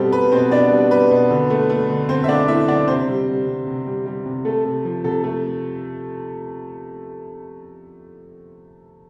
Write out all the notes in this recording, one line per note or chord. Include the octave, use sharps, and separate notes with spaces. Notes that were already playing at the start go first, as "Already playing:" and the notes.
Already playing: B2 G3 C4 A4 C5
G3 B4
B2 C4 C5
B2 D4 D5
G3
G3 B4
B2
D3
A3
A3
D3
D3 C4 C5
E5
A3 D4 D5
A3 E4 E5
D3 D4 D5
C3 C4 C5
G3
G3
C3
C3
G3
G3
C3
A3 A4
C3
F3
C3 A4
A3